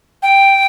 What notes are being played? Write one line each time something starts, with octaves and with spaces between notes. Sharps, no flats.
G5